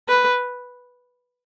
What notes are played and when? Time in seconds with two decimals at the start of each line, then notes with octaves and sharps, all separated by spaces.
0.09 B4